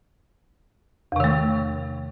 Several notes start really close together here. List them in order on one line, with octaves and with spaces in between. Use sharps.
E2 C3 D#3 A3